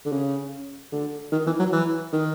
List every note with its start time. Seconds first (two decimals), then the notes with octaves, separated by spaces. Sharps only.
0.06 D3
0.12 C#3
0.92 D3
1.32 D#3
1.46 E3
1.59 F#3
1.72 E3
2.13 D#3